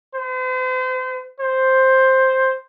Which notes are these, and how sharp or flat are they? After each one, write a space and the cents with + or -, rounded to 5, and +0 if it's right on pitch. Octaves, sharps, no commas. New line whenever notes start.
C5 -40
C5 +5